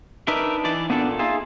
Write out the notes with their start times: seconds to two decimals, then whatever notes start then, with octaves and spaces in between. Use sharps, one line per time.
0.28 D4 D#4 A#4 B4 E5
0.65 E3 D5
0.90 A#2 B3 D4 A4
1.19 D#4 F4 G#4 E5